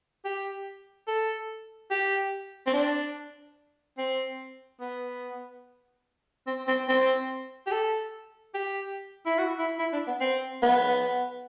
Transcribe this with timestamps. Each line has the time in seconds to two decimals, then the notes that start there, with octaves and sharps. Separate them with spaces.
0.25 G4
1.08 A4
1.91 G4
2.67 C4
2.73 D4
3.98 C4
4.81 B3
6.47 C4
6.68 C4
6.88 C4
7.67 G4
7.71 A4
8.54 G4
9.26 E4
9.38 F#4
9.59 E4
9.79 E4
9.93 D4
10.07 B3
10.21 C4
10.62 B3